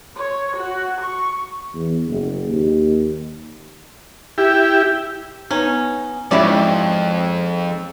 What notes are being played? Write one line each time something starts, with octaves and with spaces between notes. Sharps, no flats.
C#5
F#4
C#6
E2
F#1
D#2
E4 G4
B3 C#4 D#4
F2 G#2 C#4 E4 F#4 C#5 D5 G5